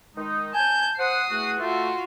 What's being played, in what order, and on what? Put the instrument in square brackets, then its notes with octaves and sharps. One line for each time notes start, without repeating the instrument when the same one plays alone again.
[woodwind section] D#3 G#3 D#4
[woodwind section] G#5 [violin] A5 G6
[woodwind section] C5 F#5 [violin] D#6 C7
[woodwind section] E2 A3 F#4
[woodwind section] A3 [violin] F4 F#4